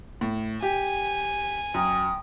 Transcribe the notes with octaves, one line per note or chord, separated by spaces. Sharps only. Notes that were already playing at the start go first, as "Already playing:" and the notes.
A2
G4 G#5
F#2 G5 D#6